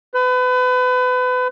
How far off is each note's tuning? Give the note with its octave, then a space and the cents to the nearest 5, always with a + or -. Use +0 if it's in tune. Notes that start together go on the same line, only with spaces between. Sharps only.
B4 +30